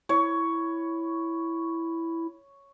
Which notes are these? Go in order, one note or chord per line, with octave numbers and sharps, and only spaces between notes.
E4 C#5